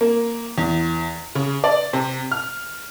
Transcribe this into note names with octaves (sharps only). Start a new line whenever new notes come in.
A#3
E2
C#3
D5
C3
F6